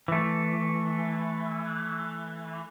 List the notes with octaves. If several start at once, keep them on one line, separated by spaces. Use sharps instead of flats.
E3 A3